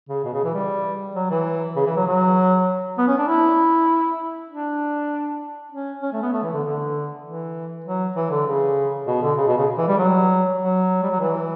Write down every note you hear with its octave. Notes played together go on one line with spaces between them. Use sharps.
C#3
B2
C#3
E3
G3
F#3
E3
C#3
E3
F#3
F#3
B3
C#4
D4
E4
D4
C#4
C#4
A3
B3
A3
E3
D3
D3
E3
F#3
E3
D3
C#3
B2
D3
C#3
B2
C#3
E3
G3
F#3
F#3
G3
F#3
E3